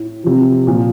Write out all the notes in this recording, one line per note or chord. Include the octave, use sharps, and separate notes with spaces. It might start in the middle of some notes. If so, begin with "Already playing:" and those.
Already playing: A2
C3 F3
A#2 F3